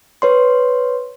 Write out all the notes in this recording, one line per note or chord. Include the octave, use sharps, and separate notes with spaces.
B4 C#5 C6